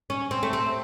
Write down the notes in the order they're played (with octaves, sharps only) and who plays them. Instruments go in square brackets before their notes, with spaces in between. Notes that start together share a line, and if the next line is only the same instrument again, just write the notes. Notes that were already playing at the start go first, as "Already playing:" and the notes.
[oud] C#4
C4
A3
C4